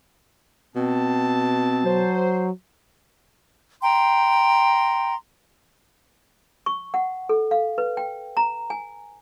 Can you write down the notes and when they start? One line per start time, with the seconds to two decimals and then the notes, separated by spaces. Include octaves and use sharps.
0.76 B2 C4 A5
1.84 F#3 C5
3.81 G5 A#5 C6
6.66 C#6
6.94 F#5
7.29 A4
7.51 F5
7.78 B4
7.97 G5
8.37 A#5
8.70 G#5